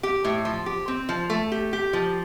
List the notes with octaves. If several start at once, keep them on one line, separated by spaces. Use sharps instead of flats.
G4
A2
F3
G4
C4
F3
A3
G4
G4
F3